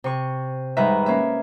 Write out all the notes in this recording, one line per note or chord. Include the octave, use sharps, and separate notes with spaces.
C3 C#6
G#2 D#3 G3 B4 E5 A#5
A#3 C#4 E5